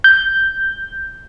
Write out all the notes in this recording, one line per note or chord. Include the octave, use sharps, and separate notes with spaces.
G6